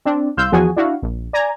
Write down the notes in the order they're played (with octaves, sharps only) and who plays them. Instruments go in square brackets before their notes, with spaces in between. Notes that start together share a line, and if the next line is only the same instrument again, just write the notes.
[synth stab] C4 D4
C2 F5 C6 E6 G6
E2 F3 F#4 G#4 G#5
D4 E4 F#4 F5
A#1
D5 G#5 A#5 G#6